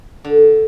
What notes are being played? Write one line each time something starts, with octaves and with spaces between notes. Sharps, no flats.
D3